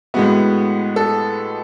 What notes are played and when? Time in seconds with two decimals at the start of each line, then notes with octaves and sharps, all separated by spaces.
0.14 A2 G#3 B3 F#4
0.96 A4